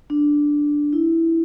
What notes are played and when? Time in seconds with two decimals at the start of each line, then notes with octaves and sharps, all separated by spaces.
0.10 D4
0.93 E4